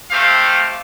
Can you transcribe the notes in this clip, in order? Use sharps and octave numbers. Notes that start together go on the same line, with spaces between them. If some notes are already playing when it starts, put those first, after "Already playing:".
A3 C4 G4 F5